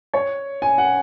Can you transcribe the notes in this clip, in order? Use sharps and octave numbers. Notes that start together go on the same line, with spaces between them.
C#5
G#5
F#5